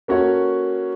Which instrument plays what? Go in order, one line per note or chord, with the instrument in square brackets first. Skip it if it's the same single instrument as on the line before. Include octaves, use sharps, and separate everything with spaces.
[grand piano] A#3 C#4 F#4 A4 C#5